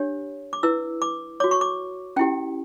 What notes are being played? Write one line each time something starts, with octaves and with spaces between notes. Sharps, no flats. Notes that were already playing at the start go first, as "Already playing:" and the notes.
Already playing: D4 G4 C#5
D6
E4 B4 E6
D6
F#4 C#5 D6
C#6
D6
C#4 E4 G4 G5